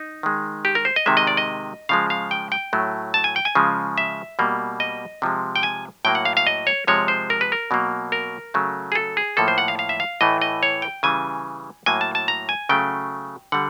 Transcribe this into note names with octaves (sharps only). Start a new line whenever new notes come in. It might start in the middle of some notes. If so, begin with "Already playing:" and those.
Already playing: D#4
D#3 G#3
G4
A#4
C5
D#5
C3 D#3 G#3 E5
D#5
D5
D#5
C#3 F3 G#3 F5
F5
G5
G5
A2 F#3 A3
A5
G#5
G5
G#5
C#3 F3 G#3
E5
B2 G3 A#3
D#5
C3 F3 G#3
G5
G#5
A2 F#3 A#3 G5
F#5
F5
F5
D#5
C#5
C3 F3 G#3 C#5
C5
A#4
B4
A#4
B2 F#3 A#3
A#4
C#3 F#3 A3
G#4
A4
G#4
A2 F3 A#3 A4
C5
F#5
F5
F5
E5
F5
A2 E3 A3 D#5
D#5
C#5
G5
C#3 E3 G3 G#5
A2 F#3 A#3 G#5
A5
A5
A#5
G#5
C#3 F#3 A3 G5
D3 G3 F#5